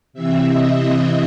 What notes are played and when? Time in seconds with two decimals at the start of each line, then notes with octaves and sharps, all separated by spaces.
0.13 C3 E3 C4 E5
0.48 D#5
0.80 D#5